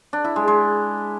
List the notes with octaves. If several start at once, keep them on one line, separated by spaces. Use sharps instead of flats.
D4
E4
G#3
G#3